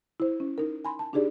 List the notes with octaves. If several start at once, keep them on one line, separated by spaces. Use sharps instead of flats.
E4 C5
C#4
D#4 A#4
G#5 B5 C6
A5
D4 D#4 G4 G#4 D5